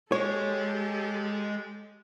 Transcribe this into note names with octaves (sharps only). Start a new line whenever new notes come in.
G#3 G4 A4 C#5